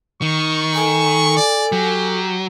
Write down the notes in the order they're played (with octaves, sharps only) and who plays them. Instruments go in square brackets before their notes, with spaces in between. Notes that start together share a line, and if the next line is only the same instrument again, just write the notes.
[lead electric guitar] D#3 [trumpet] C#6
[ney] A4 [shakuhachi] G#5
[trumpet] D5
[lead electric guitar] F#3 [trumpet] G4